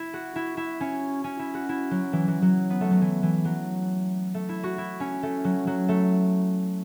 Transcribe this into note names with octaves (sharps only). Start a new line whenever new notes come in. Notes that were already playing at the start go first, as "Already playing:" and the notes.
Already playing: E4
F#4
E4
E4
C#4
C#4
E4
F#4
E4
F#3
E3
F#3
F#3
B3
A3
F#3
E3
E3
F#3
A3
E4
F#4
E4
C#4
A3
F#3
F#3
A3